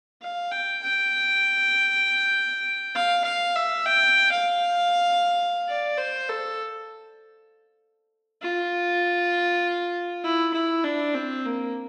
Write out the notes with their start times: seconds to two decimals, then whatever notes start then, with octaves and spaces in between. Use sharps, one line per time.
0.22 F5
0.52 G5
0.83 G5
2.95 F5
3.25 F5
3.56 E5
3.86 G5
4.32 F5
5.69 D5
5.98 C5
6.29 A4
8.41 F4
10.24 E4
10.54 E4
10.84 D4
11.14 C4
11.46 A#3